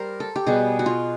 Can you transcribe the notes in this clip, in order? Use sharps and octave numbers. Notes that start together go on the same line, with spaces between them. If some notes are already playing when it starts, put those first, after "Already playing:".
Already playing: G3 A#4 C5
A4
G4
B2 G3 B3 G#4
F#4
F4